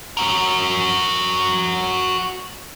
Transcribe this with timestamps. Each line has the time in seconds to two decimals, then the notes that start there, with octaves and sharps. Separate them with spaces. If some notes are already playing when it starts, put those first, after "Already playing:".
0.17 F#4 A#4